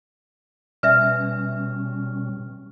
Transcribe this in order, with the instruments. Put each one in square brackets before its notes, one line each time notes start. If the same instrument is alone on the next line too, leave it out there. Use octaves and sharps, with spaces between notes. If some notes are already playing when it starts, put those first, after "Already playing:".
[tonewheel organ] B2 G3 C#4 [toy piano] B4 D5 E5 [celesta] F6